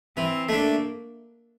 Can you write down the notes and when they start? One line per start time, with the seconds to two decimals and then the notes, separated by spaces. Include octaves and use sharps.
0.17 E3 C4
0.49 A3 A#3 D4